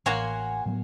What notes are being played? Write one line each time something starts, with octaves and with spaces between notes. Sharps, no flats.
A1 A#3 F#4 C#5 F#5 G#5 C6
A2 F#3 B3